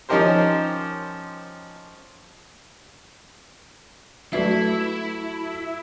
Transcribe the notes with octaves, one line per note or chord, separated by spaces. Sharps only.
F3 C#4 D#4 G4 A#4 C5
F#3 A3 E4 F#4 B4 E5